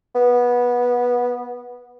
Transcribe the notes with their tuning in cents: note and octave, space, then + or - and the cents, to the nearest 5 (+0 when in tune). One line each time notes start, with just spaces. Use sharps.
B3 -15